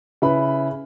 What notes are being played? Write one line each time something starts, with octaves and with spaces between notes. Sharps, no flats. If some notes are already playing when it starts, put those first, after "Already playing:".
C#3 E4 B4 B5